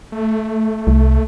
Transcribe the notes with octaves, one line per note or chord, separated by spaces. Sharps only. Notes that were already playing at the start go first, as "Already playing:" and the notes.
A3
C2